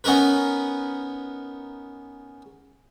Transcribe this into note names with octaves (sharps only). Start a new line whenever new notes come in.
B3 C#4 D#4 A#4 B4